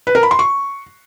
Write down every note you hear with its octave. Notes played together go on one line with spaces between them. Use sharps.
B4
A#4
B5
C6
C#6